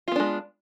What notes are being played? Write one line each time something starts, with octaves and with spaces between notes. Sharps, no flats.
G#3 B3 D4 F4